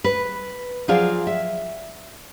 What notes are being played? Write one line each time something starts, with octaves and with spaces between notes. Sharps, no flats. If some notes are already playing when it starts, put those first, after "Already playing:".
B4
F3 F#3 F4 G#4 D5 F5
E5